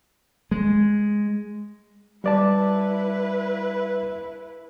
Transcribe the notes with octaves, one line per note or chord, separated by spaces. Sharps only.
G#3
G3 E4 B4 D5 A5